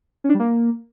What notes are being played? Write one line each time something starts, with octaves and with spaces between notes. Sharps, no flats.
C#4
D4
G3
A#3